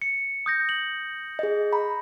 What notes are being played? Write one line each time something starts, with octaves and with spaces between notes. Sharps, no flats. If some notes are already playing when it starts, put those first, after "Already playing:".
C#7
D#6 G6 A#6
F#7
G#4 D#5
A#5 B5